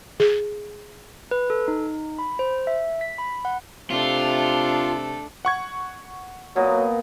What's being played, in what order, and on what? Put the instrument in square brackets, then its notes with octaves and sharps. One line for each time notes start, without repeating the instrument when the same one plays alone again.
[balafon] G#4
[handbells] B4
A4
D#4
B5
C5
E5
B6
B5
F#5
[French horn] C3 [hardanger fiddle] A3 A4 [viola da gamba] D4 [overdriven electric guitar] F4
[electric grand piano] F#5 C#6 G#6
[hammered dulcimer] A#2 B3 D#5 [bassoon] F#3